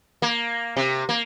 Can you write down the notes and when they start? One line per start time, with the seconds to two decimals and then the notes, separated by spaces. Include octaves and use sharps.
0.22 A#3
0.77 C3
1.09 A#3